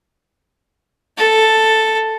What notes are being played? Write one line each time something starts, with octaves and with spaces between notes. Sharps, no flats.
A4